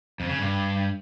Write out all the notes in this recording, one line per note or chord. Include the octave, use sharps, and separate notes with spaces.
F2
C#3
G2